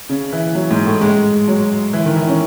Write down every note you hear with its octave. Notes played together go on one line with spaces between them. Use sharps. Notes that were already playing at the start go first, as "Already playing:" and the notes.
C#3
E3
F#3
G#2
A2
G#3
F#3
E3
D#3
E3
C#4